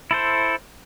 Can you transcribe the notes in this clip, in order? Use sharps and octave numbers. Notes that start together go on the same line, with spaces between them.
E4 A4 C5